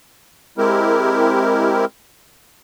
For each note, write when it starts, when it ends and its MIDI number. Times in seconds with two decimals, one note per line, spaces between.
0.58 1.85 56
0.58 1.85 60
0.58 1.85 64
0.58 1.85 67
0.58 1.85 70